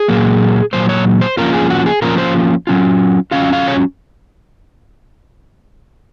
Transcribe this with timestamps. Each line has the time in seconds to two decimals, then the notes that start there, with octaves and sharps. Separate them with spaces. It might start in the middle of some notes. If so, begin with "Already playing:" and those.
Already playing: G#4
0.08 A#2 F#3 A#3
0.73 A#2 F#3 A#3 C5
0.89 C#5
1.21 C5
1.37 F3 A#3 C#4 F4 A#4
1.53 G#4
1.70 F#4
1.86 G#4
2.02 F3 A#3 C#4 F4 A#4
2.18 C5
2.67 F#3 C#4 F4
3.31 F#3 C#4 F4 F5
3.53 F5
3.68 C#5